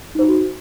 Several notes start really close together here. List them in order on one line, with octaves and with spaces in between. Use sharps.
D#4 C5 F#4